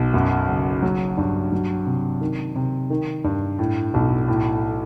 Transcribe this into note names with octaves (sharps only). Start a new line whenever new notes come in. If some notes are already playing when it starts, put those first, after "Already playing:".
Already playing: B1
F#2
F#1
F#3
G2
F#3
C3
D#3
C3
D#3
G2
A2
B1
A2